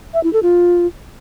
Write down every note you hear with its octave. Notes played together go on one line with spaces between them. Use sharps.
E5
E4
A4
F4